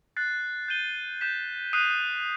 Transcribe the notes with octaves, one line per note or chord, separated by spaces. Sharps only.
F#6 A6 C7
G6 D#7 G7
G6 B6 E7
D#6 F#6 C7 D#7